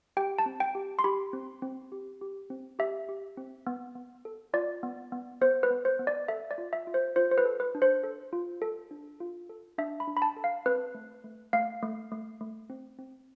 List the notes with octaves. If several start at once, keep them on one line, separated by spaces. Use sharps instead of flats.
G4 G5
A5
C4
G5
G4
C6
G4 B5
C4
C4
G4
G4
C4
G4 E5
G4
C4
B3
B3
A4
F4 D5
B3
B3
B3 C5
B4
B3
C5
B3
D5
A4 E5
D5
F4
E5
F4
C5
F4 C5
C5
B4
A4
B4
D4
C5
A4
F4
A4
D4
F4
A4
D4 E5
B5
D4
B5
A5
A4
F5
C4 B4
A3
A3
A3 F5
A3
A3
A3
C4
C4